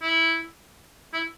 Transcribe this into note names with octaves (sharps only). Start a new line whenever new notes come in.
E4
E4